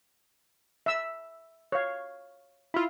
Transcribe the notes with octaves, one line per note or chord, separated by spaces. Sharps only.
E5 E6
C#5 F5
E4 F4